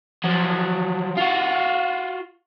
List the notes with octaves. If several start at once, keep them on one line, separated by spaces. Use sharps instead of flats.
F3 F#3
F4 F#4